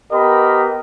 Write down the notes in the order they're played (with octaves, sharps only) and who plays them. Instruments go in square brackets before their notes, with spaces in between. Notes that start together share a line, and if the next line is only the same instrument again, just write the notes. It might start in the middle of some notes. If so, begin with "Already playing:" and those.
[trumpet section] B3 G4 A#4 D#5 B5